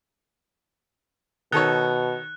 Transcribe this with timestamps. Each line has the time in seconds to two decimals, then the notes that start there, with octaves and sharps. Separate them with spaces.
1.52 B2 D#3 A4 C#5 F#6